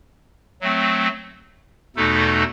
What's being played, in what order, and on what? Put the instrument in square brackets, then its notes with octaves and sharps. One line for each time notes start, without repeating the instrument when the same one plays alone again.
[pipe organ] F#3 A3 C4
E2 B2 A3 D#4 A4